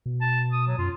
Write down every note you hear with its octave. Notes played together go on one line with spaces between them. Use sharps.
B2
A5
D#6
F#3
F#2 F4